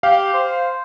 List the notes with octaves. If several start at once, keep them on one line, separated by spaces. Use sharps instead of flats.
G4 F5
C5